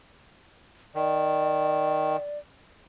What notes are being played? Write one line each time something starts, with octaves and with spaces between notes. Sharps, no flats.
D#3 D5